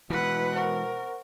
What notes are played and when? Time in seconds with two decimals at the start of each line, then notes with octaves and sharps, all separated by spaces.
0.10 B2 E3 G#3 E4 B4 F#5
0.55 A#4 C5 F#5 C#6